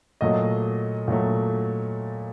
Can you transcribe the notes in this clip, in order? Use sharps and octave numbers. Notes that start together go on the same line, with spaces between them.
A#2 F#3 A3 D#5
A#2 F#3 A3